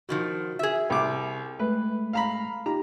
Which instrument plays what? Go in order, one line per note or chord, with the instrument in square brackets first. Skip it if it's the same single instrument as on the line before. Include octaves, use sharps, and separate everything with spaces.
[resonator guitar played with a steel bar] B2 D#3 F3 [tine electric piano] F#4
[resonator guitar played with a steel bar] G#4 E5
[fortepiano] C2 D6
[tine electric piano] G#3 A3 [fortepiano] B4
[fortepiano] F5 A#5 B5
[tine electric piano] D#4 F4 G4 [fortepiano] A#5